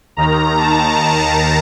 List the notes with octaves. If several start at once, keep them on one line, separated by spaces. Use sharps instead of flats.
D#2 D#3 A#5
A5